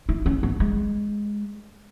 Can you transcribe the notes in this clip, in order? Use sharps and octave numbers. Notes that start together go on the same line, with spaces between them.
E4
C#4
B3
G#3